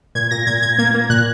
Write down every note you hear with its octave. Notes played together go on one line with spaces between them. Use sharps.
A#2 G#6
A#2 A#6
A#2 G#6
A#2 G#6
A#3 G#6
A#3
A#2 F#6